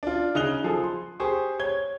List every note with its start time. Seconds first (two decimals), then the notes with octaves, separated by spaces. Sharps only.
0.03 D4 F4
0.35 C#3 D#4 G#4 F#6 F7 G7
0.64 F3 G#4 A4
0.84 C6
1.20 G4 G#4 C5 C#6
1.60 C#5 G#6 G7